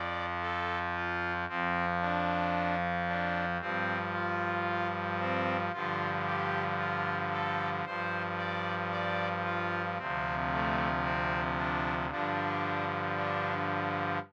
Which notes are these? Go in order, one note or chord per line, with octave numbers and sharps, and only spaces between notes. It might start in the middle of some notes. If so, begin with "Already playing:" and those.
Already playing: F2 F3 D5
A4
F4
F2 F3 C4
D4
D4
G2 F3 C4
F4
C4
G2 D3 F3 F4
G4
F4
A4
G2 F3 C5
D5
D5
F4
D2 C3 F3 C4
A3
C4
D4
G2 D3 F3 D4
D4